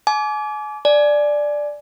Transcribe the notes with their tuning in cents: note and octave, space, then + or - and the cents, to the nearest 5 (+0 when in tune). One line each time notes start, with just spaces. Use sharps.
G#5 +35 D6 -20
D5 +0 G#5 +20